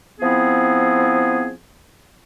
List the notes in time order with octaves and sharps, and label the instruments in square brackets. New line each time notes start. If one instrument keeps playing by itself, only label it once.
[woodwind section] F3 B3 C4 E4 G#4